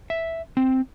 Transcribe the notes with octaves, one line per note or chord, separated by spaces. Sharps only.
E5
C4